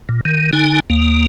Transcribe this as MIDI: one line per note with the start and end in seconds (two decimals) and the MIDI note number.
0.09 0.21 46
0.25 0.51 51
0.53 0.80 50
0.53 0.80 63
0.53 0.80 80
0.90 1.26 39
0.90 1.26 58